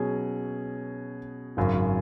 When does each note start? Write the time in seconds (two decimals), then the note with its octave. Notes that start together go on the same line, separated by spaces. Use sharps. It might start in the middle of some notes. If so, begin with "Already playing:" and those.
Already playing: B2 F#3 C#4 G#4
1.57 G#1 F#2 C#3